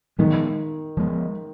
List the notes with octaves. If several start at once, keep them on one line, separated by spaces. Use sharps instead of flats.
D#3 F3 G#3 B3
F3 G#3 B3